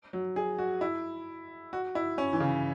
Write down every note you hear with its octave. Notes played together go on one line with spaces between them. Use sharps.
F#3
G#4
F#4
E4
F#4
E4
C#4
E3
C#3